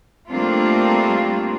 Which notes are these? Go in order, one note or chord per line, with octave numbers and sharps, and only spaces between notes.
G3 A3 A#3 C4 D4 F4